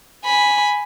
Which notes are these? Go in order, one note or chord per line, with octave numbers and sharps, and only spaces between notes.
G#5 B5